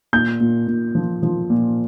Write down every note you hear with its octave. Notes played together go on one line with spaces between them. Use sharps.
A#2 G6
A#2
A#2
F3
F3
A#2